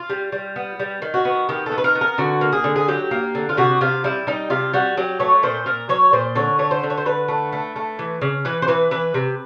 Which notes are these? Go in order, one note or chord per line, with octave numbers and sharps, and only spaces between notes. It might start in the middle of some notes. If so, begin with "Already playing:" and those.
Already playing: F4
G3
G3
B3
G3
D#3
F#4
B3
D#3 G4
A4
B3
B4
A#4
B3
A#4
D3 F#4
A#3
G#4
D3
G#4
F#3 G4
A#3
D3
F4
C3 F#4
C3 F4
G3 E4
G3 D#4
C3 F4
G3 F#4
F#3 G4
A3 C#5
A#2 C5
A#2 A#4
F#3 C#5
A#2 C5
D3 C#5
A3 C#5
C5
D3
C#5
C5
D3 B4
A3
A3
A3
E3
C#3
E3 B4
C5
E3 B4
E3 B4
C3